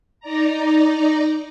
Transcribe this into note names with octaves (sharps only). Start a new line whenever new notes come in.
D#4 D5 A#5